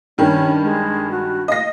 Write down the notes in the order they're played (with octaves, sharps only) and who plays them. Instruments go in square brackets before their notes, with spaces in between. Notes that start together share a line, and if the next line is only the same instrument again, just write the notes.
[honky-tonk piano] G2 D#3 [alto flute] C#4
[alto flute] G#3
F#4
[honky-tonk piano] D#5 A#6 [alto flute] F5